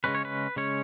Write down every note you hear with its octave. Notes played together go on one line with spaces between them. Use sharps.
C#3 G#3 C#4 B4
C#5
B4
C#3 G#3 C#4 C#5